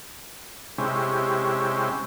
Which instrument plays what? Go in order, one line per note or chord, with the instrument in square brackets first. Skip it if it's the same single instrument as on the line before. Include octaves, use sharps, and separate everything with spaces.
[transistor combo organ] C3 G#3 C#4 E4 G4